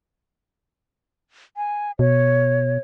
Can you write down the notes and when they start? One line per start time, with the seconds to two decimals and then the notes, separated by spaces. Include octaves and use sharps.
1.57 G#5
1.99 B2 C#5